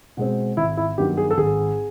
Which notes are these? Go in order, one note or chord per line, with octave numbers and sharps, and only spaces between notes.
B2 G#3 C4
G#1 E4
E4
G2 D#3 F#3 B3 G4
G#4
A4
G#1 G#4